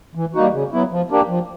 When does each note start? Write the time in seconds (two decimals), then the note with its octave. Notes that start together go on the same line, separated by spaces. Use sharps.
0.15 E3
0.35 G3 A#3 D#4 F#4
0.54 C#3
0.72 F#3 B3 E4
0.92 F3
1.11 A#3 D4 G4
1.29 F3